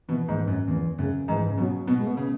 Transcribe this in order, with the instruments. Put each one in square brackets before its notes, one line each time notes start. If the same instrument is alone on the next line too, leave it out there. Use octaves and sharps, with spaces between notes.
[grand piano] B2 [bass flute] E3
[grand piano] G#2 [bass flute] E3
[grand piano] F#2 [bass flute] F#3
[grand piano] E2 [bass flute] E3
[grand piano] F#2 [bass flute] C#3
[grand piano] G#2 [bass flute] E3
[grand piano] C#3
[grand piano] B2 [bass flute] F#3
[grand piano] B2 [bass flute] B3
[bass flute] G#3
B3
[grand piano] C#3